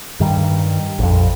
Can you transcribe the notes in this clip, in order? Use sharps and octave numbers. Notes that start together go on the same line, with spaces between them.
G2 D#3 G3
A#1 F2